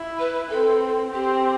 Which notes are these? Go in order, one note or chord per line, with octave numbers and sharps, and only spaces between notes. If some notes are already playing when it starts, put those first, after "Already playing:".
Already playing: E4
B4
C4 A4
C4 G4